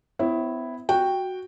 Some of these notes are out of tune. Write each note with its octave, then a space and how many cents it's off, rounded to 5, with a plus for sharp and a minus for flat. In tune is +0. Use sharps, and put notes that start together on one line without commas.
B3 +40 E4 +0 C#5 -40
F#4 +0 G5 +0